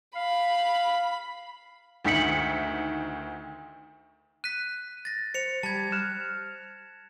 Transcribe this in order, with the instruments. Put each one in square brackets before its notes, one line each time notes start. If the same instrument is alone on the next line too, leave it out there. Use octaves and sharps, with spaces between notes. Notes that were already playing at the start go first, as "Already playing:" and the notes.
[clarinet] F5 [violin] B5
[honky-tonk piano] D2 D#3 E4 B6 C#7 F#7
[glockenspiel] F#6 B6 [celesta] D#7
[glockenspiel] A6 A#6
[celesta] C5 [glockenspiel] C#7 F7
[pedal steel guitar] G3 [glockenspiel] A5 G#6
[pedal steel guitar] F6 [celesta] F#6 E7